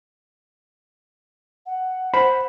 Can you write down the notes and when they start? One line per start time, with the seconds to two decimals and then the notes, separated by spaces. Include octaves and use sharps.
1.66 F#5
2.14 C5 B5